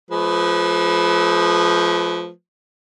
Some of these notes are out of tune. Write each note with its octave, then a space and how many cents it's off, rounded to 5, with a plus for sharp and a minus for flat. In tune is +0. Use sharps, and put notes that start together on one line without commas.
F3 +5 A3 -45 B4 +0